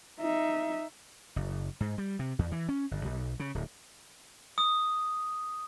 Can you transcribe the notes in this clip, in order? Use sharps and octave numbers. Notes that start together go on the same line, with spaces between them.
D#4 E5
F#1
G#2
G3
C3
E2
E3
C#4
G1
B1
C#3
D1
D#6